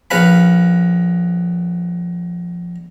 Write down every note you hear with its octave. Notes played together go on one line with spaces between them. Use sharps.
A#1 C#4 B4 F5 B5